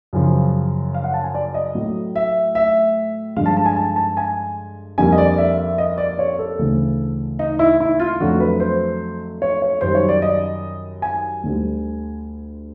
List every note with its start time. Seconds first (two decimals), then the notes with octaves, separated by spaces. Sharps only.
0.13 F#2 C#3 F3
0.94 F5
1.04 F#5
1.14 A5
1.24 G#5
1.35 D5
1.54 D#5
1.75 A2 F#3 A3
2.16 E5
2.55 E5
3.36 G2 D3 F3 G#3 F5
3.46 A5
3.57 A5
3.66 G#5
3.77 A5
3.96 A5
4.17 G#5
4.98 F2 D3 G3 A#3 G#5
5.12 D#5
5.18 D5
5.38 E5
5.58 E5
5.78 D#5
5.98 D5
6.19 C#5
6.39 A4
6.59 D2 C#3 E3 A3
7.39 D#4
7.59 E4
7.80 E4
8.00 F4
8.20 F2 D3 F#3 A3 F#4
8.40 B4
8.60 C5
9.42 C#5
9.62 C#5
9.81 F#2 D#3 G3 C5
9.95 C#5
10.09 D5
10.22 D#5
11.02 G#5
11.43 D2 D3 G3